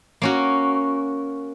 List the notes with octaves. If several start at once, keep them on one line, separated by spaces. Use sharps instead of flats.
A#3 C#4 F#4